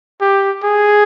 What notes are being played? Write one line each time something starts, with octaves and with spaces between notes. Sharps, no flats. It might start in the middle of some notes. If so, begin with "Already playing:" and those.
G4
G#4